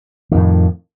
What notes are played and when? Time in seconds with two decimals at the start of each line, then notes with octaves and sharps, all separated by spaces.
0.32 D#3
0.34 F2
0.37 A2